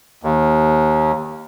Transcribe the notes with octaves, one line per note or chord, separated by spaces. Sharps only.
D#2